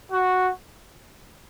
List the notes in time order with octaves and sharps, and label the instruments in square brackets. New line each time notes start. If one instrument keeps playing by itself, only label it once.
[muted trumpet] F#4